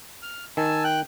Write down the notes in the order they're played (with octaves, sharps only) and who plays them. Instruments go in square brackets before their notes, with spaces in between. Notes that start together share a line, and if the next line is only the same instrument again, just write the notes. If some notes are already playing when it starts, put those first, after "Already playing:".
[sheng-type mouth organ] F6
[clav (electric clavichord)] D#3 [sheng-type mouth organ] G#5 A5 E6
[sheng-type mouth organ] G5 F#6